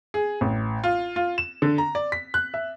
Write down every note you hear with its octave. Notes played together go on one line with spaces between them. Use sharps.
G#4
A1
F4
F4
E7
D3
A#5
D5
B6
F#6
E5